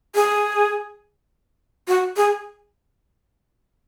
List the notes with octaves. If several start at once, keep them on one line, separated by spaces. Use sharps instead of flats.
G#4
F#4
G#4